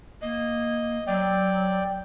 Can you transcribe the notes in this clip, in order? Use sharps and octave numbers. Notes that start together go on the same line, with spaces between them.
A#3 D#5
F#3 D5 G5